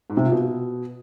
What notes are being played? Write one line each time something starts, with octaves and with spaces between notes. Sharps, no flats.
G#2
C3
A#2
B2